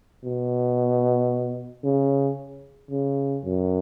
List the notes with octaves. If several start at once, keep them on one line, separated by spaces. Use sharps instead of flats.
B2
C#3
C#3
F#2